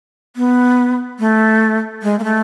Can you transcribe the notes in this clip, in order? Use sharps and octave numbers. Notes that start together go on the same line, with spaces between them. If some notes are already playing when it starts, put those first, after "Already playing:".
B3
A3
G#3
A#3
A3